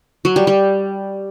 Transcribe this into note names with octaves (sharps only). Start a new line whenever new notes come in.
F#3
G3
G3